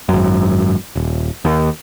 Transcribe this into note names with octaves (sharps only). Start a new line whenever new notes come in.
G#1 F#2
D#1
D#2